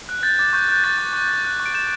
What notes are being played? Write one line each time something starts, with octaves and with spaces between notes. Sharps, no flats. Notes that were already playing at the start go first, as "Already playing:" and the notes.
F#6
G6 A6
D6 A6
C#6 G6
F#6 G6
C#6 A6
C#6
C#6
G6
F#6
C#6
D7
G6 E7